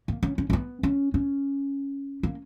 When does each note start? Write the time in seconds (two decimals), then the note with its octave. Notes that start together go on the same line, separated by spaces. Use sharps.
0.08 A#3
0.23 C#4
0.38 C#4
0.50 C#4
0.53 B3
0.83 C#4
1.14 C#4
2.23 A#3